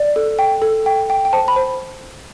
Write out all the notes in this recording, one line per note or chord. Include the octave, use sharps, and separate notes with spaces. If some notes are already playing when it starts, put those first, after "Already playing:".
Already playing: D5
A4
G5
A4
G5
G5
G5
C5 A5
B5
C5